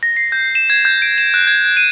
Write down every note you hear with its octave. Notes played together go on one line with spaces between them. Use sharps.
A#6
C7
G6
E7
G#6
G6
D7
E7
F#6
G#6
G#6
D#7